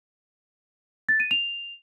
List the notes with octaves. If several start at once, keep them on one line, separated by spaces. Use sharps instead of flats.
A6
D#7
F7